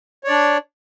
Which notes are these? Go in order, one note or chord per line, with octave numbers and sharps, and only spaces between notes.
D4 C#5 D5